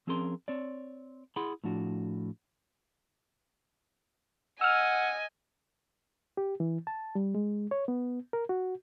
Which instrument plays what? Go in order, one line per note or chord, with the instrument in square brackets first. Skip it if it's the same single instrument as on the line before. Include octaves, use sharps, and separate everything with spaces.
[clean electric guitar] F3 C4 C#4 G#4 A#4 C6
C4 C#5 D5
E4 G#4 F#5 B5 C6
A2 F3 D4 F#4
[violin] D#5 G#5 [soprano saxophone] F#5 [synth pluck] E6 F6
[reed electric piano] G4
E3
A5
G3
G#3
C#5
B3
A#4
F#4